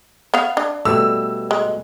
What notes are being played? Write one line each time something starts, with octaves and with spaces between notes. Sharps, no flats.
B3 F5
D4
B2 G3 A3 E6
G#3